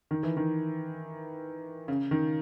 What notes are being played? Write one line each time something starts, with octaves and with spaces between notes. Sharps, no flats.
D#3
E3
D#3
C#3
D#3